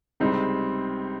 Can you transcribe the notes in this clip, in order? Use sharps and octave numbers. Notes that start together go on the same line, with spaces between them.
C#2 C3 G3 C4 D#4